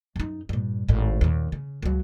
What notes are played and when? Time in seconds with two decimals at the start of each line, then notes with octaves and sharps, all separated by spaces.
0.16 F#2 D#4
0.49 G2 A#2
0.88 G#1 A2
1.21 D#2 A#2
1.52 C#3
1.82 C#2 F#3